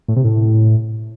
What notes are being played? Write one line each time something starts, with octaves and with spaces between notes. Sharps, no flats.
A2
C3
A2